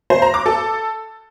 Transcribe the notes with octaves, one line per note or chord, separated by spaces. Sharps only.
C5
A#5
D6
A4